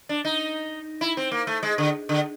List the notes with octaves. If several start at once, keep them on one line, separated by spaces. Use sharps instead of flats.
D4
D#4
E4
C4
A#3
A3
G#3
D3
D3